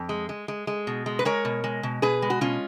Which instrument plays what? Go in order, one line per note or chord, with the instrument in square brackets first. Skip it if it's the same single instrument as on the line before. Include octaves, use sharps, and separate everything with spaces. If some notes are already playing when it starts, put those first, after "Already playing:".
Already playing: [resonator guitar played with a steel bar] F2
G#3
G#3
G#3
G#3
B2
G#3
B4
G#3 A#4 C#5
B2
G#3
B2
B2 G#4 B4
G#3
F#4
B2 C#4 F4